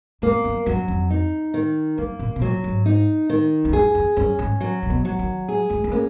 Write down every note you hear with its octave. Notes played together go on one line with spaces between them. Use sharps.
F2 A#3
F#2
F#2 F#3
F2
D#4
D#3
F#2 A#3
A#2
B2
A#2 F#3
G#2
D#4
D#3
F2
F#2 G#4
F2
F#2 C#4
G#2
F#3
A#2
B2
F#3
D#3
G#4
G#3
G#3
A#3 C#4